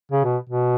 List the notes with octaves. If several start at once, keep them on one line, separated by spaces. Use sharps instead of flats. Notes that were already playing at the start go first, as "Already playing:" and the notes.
C#3
B2
B2